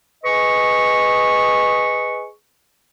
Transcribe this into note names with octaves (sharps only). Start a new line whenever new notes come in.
G#4 B4 D#5 C#6